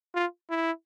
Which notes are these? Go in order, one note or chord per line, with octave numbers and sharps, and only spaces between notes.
F4
E4